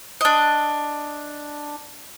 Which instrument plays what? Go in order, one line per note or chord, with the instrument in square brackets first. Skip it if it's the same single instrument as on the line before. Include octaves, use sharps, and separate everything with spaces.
[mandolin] D4 D#5